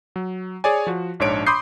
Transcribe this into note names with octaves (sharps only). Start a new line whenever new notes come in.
F#3
G#4 C#5 D5 G#5
F3 F#4
A#1 G#2 D4 C#5 D7
B5 C6 D6 D#6 G6 C7